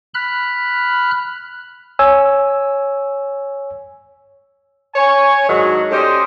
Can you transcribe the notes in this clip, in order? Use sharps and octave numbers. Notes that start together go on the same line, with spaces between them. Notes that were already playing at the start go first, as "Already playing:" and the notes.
B5 F6 F#6
C#5 G#5 E6
C#5 G#5
G#2 D#3 F#3 D4 F#4
A3 C#4 G4 C5 D5 D#5